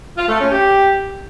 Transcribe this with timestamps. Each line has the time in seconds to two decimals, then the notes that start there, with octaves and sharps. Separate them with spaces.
0.17 F4
0.28 A3
0.40 C#4
0.51 G4